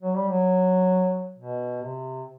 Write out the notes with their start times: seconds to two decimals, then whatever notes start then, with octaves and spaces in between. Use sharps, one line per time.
0.03 F#3
0.16 G3
0.29 F#3
1.38 B2
1.82 C3